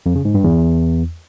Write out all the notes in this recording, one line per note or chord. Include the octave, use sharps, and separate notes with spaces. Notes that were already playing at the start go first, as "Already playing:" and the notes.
F2
C#3
G#2
G2
E2